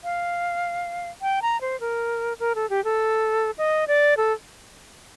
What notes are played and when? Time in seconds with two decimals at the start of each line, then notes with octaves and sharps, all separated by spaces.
0.04 F5
1.22 G5
1.42 A#5
1.61 C5
1.80 A#4
2.40 A#4
2.55 A4
2.70 G4
2.84 A4
3.58 D#5
3.88 D5
4.17 A4